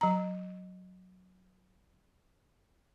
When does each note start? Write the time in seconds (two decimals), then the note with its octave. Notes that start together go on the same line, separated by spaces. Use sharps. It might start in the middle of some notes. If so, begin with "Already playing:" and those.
0.01 F#3 A#5